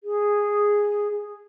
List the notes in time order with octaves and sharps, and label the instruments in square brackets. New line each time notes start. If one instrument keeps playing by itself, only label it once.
[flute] G#4